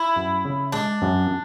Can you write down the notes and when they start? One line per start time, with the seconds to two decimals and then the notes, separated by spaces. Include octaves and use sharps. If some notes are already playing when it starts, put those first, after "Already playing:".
Already playing: E4
0.16 F#2
0.45 C#3
0.72 G#3 D4
1.02 F#2